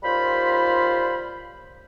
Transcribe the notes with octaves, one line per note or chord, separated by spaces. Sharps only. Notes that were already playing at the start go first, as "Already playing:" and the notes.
D#2 G3 F4 C5 F5 B5